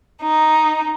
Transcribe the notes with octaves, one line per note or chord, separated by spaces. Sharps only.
D#4